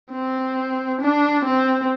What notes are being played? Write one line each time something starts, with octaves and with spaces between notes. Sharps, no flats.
C4
D4
C4